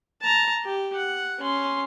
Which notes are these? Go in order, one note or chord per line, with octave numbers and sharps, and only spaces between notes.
A5 A#5
G4
F#5
C#4 C6